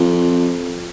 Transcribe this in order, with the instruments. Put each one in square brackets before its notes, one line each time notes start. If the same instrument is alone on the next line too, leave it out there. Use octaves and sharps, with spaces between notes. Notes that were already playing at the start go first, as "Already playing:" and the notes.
Already playing: [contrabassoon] F2